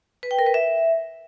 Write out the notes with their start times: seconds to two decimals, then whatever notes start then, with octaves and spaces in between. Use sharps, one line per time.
0.23 B4
0.31 G5
0.39 A#4
0.46 B4
0.54 E5